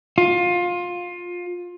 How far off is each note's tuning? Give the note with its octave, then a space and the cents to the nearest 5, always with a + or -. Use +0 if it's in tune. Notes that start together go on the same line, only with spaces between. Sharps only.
F4 +20